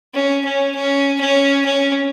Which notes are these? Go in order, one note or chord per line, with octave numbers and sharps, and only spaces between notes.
C#4
C#4
C#4
C#4
C#4